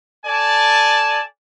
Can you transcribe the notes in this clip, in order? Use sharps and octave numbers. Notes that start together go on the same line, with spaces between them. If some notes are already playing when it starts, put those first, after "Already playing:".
A4 D5 G#5 A5